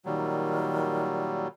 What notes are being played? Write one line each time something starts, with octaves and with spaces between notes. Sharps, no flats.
A#2 D#3 F#3 G3